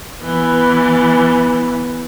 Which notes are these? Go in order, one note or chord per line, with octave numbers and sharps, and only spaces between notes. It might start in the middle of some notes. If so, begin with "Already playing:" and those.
E3 B3